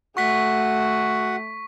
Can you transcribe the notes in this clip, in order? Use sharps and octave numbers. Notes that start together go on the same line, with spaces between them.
A3 F#4 F#5 C#6 B6